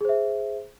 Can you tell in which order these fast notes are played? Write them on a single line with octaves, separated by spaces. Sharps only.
G#4 C5 E5